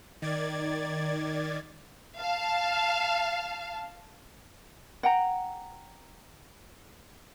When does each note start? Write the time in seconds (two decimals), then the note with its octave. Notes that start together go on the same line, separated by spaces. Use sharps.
0.22 D#3 D5 G#6 A6
2.19 F5 A5
5.03 F#5 G5 A#5